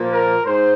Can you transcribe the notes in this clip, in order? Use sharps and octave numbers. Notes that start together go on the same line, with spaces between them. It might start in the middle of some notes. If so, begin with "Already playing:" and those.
Already playing: A#2 F3 A#3
A#4
G#2 C5